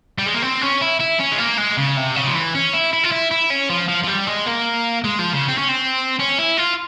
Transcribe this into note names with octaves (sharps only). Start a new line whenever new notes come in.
G3
G#3
A#3
C4
C#4
E4
E4
C#4
G#3
A#3
G#3
C#3
C3
C#3
F3
E3
C#4
E4
E4
F4
E4
E4
C#4
F3
F3
F3
G3
G#3
A#3
G#3
F3
C#3
C4
C#4
C4
C#4
E4
F4